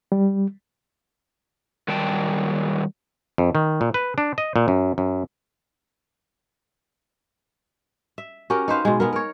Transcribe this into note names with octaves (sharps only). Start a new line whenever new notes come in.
G3
D#3 F#3 G3 G5 A5
F2
D#3
A#2
B4
D4
D#5
A#2
F#2
F#2
E5
C#4 F#4 G4 A#4
D#4 B4 C5 F5
B2 G#3
G#3 B3 A#4
A#4 C#5